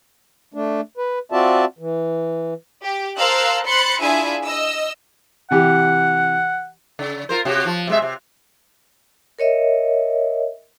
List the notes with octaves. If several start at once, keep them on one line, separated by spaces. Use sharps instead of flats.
A3 D4
B4
C4 F4 F#4 D5 E5 A5
E3
G4
A#4 C5 F5 A5 E6 F#6
C5 B5 C6 F#6 A6 C#7
D4 E4 F4 G#4 E5 G#5
D#5 E6
C3 E3 G4 F#5
C#3
F4 A#4 C5
C3 F#4 G4
F3
C3 G#3 E5
C3
A#4 C#5 D#5 E5